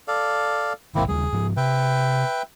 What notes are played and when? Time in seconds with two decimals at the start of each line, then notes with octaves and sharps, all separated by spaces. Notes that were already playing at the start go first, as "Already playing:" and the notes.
0.08 A4 D5 F5
0.95 A#1 G#2 D#3 A#3 C4 E4
1.08 D#2 C#3 G3 G#4
1.33 G#2 F3
1.57 C3 B4 E5 G5